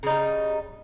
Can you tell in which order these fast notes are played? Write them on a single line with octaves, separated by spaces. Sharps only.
C#3 D#4 G3